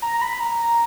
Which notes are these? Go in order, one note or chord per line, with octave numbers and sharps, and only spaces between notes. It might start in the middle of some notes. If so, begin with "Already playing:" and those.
A#5
B5
A#5
A#5